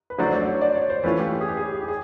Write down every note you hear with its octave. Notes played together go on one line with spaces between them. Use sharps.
B4
D3 F#3 A3 D4 F#4 C5
D5
C#5
D5
C#5
C5
E3 A3 C#4 F4 B4
G4
G4
G#4
G4
G#4
G4
G#4
G4
G#4